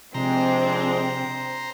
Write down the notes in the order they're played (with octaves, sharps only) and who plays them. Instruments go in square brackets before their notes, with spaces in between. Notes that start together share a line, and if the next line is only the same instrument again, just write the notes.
[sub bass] C3 [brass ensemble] F3 G#3 D4 [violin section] C4 [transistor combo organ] C5 A#5